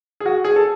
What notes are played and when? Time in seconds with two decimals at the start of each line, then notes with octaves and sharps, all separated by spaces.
0.20 G#4
0.25 F#4
0.44 G#4
0.56 A4